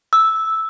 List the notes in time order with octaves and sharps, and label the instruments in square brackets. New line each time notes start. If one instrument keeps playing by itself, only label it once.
[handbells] E6